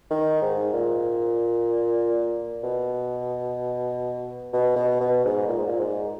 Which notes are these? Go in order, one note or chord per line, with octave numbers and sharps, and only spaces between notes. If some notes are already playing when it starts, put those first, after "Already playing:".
D#3
G#2
A#2
B2
B2
B2
B2
G#2
A#2
G#2
A#2
G#2